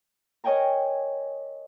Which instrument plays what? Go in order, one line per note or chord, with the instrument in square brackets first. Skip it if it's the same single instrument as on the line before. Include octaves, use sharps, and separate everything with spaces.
[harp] A#4 C#5 D#5 G5 G#5 A#5